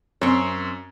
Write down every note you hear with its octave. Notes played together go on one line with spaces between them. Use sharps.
F#2 C4 C#5